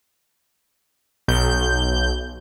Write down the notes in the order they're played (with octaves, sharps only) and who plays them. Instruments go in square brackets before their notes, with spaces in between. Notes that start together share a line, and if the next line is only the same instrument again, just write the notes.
[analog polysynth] B1 G6